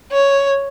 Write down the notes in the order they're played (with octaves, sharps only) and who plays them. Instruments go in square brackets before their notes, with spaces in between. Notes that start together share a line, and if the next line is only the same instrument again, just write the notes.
[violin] C#5